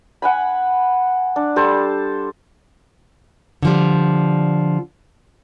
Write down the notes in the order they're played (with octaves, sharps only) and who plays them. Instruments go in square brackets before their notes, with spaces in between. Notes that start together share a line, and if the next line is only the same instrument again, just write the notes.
[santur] F#5 G#5 B5
D4
G3 A4 C5 A5
[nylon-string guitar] D3 F3 G3